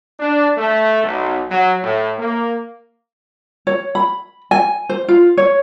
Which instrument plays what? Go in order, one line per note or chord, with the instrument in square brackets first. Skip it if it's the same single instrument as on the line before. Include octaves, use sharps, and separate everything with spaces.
[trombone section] D4
A3
B1
F#3
A2
A#3
[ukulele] C#5
B5
G#5
C5
F4
C#5